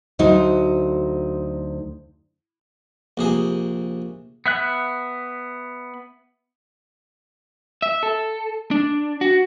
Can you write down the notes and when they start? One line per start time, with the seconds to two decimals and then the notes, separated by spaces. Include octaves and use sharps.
0.19 D2 F#3 D#4 C5
3.17 A#1 C3 G#4
4.46 B3 E5 F#6
7.82 E5
8.03 A4
8.71 D4
9.21 F#4